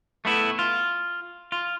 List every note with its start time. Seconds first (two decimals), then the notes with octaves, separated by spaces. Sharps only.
0.25 A3 B3 E4
0.59 F4
1.52 F4